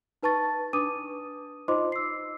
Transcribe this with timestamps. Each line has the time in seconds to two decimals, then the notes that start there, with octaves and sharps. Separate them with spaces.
0.23 D#4 B4 A5 C#6 A6
0.73 D4 B4 D6 D#6 D#7
1.68 D#4 F4 C5 D#5 C6 D6
1.92 E6 C7